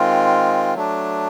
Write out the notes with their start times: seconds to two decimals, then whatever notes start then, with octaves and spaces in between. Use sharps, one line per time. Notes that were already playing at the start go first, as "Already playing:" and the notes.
Already playing: D#3 G#3 C4 F4
0.75 F#3 A3 D4